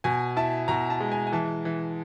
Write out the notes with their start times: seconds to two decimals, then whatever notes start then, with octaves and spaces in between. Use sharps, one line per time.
0.04 B2 G#5
0.37 E4 A5
0.68 B2 A#5
0.90 A5
1.00 G#3
1.12 G#5
1.27 G#5
1.32 E3 A5
1.65 E3